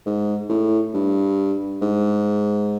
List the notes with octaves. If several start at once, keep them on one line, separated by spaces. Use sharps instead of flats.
G#2
A2
G2
G#2